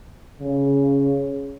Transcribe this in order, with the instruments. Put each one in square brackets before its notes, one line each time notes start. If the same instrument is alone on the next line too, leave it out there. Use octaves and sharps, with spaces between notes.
[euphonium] C#3